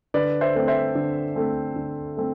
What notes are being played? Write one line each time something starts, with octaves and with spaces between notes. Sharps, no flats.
D3 B4 D5
C5 E5
A3 C4
C5 E5
D3
A3 C4
D3
A3 C4